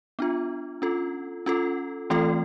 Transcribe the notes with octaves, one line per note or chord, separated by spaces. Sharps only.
B3 D4 F4
C#4 F4 A4
C#4 F4 A4
E3 A3 C4 F4 A4